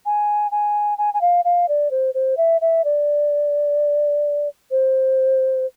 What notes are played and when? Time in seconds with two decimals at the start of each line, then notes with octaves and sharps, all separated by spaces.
0.06 G#5
0.51 G#5
0.98 G#5
1.14 G#5
1.21 F5
1.45 F5
1.68 D5
1.91 C5
2.14 C5
2.37 E5
2.61 E5
2.84 D5
4.71 C5